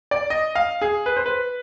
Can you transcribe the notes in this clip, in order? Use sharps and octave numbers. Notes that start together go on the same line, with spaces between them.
D5
D#5
F5
G#4
B4
C5
B4